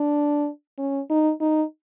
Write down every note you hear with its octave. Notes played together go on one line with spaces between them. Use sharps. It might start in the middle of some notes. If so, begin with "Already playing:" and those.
Already playing: D4
C#4
D#4
D#4